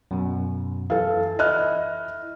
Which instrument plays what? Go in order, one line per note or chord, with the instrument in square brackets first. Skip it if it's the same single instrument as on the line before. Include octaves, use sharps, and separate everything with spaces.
[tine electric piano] F#2 B2
[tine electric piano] E3 [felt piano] A4 F5
[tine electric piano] E4 [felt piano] D#5 F6 F#6